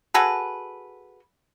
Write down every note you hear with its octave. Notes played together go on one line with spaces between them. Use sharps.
F#4 G#4 A4 B4